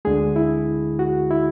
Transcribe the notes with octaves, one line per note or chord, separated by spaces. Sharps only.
D2 D3 G#3 G#4
E4
F#4
E4